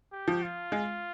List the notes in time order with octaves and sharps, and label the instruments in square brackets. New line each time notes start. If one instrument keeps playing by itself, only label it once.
[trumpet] G4
[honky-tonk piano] F3
[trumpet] F4
[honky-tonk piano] G#3